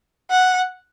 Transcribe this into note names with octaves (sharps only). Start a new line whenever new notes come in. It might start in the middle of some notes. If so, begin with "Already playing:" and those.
F#5